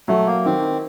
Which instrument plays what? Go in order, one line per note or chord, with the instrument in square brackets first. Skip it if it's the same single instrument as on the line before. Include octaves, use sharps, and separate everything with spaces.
[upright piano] F#3 [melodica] A3
[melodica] A#3
[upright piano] D#3 [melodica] C4